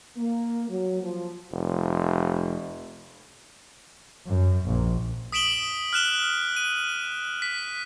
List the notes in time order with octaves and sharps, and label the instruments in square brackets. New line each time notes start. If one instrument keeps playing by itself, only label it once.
[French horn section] A#3
F#3
F3
[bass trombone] F1
[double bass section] F#2
A#1
[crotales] D#6 B6 D7 E7 F#7 G7
F6 F#6 E7 G7
D#7
B6